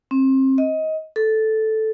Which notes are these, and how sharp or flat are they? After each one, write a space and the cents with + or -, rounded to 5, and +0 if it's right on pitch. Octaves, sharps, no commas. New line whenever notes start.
C4 +30
D#5 +20
A4 -5